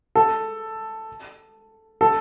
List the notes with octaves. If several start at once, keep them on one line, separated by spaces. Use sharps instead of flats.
A4
A4